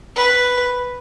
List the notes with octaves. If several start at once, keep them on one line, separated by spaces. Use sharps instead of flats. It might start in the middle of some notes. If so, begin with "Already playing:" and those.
B4